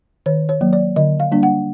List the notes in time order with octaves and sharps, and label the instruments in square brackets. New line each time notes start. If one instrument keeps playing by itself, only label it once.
[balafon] D#3 C#5
C#5
F#3 A#3
D5
D3 D#5
F5
G3 A#3 D4
F#5